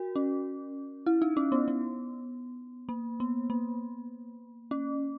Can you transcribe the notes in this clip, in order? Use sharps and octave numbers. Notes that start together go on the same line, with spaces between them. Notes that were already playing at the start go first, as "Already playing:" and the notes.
Already playing: F#4 A#4
C#4
E4
D#4
C#4
B3
B3
A#3
B3
A#3
C#4